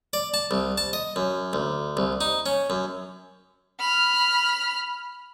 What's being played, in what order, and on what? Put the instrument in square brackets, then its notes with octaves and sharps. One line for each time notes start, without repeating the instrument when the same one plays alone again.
[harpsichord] D5
A5
C2
A5
D#5
F#2
D2
C2
D#4
C#4
F#2
[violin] B5 F6